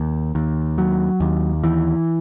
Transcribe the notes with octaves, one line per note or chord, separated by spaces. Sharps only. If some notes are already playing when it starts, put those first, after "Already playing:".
Already playing: D#2
D#2
F#3
D#2
E3